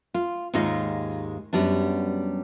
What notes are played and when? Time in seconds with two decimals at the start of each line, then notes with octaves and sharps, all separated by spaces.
0.14 F4
0.53 D#2 G#2 G#3 D#4 F4
1.53 F#2 G3 B3 D4